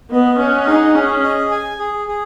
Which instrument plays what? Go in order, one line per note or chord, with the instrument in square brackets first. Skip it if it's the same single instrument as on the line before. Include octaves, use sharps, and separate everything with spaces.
[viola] B3 [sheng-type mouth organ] D#5
[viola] C#4 [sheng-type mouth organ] F#5
[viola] D#4 [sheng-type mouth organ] G#4
[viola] C#4 [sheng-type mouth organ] G#4
[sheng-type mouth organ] D#5
G#5
G#4
G#4